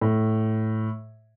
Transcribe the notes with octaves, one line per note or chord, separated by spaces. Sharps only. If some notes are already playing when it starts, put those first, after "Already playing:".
A2